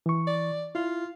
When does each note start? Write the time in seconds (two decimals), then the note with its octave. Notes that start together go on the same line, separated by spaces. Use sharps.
0.06 E3 C#6
0.27 D5
0.75 E4 F4